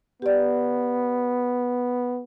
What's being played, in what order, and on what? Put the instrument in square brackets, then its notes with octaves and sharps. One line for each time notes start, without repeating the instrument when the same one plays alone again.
[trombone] B3 [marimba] G4 D5